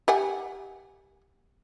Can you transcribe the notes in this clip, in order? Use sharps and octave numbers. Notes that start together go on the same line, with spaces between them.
G4 F#5 G#5